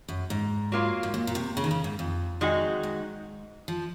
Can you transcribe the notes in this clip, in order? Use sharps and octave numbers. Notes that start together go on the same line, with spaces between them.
F#2
G#2
F#3 A#3 F4
G#2
A#2
A#2
C3
C#3
D#3
C#3
G#2
F2
D#3 G#3 D#4 F#4
G#2
F3